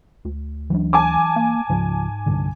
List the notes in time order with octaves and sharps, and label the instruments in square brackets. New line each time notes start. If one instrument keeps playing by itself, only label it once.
[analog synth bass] D2
[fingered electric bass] E3 F#3 D4
[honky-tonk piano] G#5 A5 D6
[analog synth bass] A#3
[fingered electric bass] C#2 F3 [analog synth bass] G#2
[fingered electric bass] C2 G2 D3